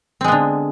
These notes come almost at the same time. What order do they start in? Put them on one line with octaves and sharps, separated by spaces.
C4 G#3 B3 D3